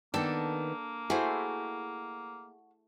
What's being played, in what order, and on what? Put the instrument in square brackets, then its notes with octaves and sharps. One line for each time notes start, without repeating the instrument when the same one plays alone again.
[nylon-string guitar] D#3 B3 [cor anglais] A#3 [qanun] D4 [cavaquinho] A4 G5
[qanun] A3 E4 C5 [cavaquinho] F#4 [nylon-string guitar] G#4